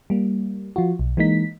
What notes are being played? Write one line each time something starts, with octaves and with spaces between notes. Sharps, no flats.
G3 A#3
F3 F4 F#4
B1
E3 G#3 A#3 D#4 B6